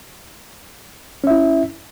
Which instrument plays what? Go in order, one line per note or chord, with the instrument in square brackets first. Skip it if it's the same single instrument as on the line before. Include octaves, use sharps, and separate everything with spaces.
[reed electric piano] C#4
E5
E4